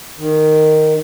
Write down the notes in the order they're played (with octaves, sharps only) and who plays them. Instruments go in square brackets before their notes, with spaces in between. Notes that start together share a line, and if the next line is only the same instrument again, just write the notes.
[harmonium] D#3